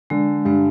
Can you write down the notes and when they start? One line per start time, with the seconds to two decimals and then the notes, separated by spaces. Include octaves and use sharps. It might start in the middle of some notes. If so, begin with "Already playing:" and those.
0.10 D3 G#3
0.45 G2 G#3